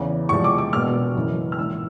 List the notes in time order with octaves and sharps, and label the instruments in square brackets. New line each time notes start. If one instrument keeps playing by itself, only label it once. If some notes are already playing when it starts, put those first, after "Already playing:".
Already playing: [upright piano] E2 C#3 E3
E2 C3 F3 G#3 C#6
D6
D6
E1 E2 B2 F6
F#2 C#3 E3
F6
A#1 G#2 E3 E6